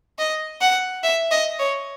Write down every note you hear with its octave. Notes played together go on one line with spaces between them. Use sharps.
D#5
F#5
E5
D#5
C#5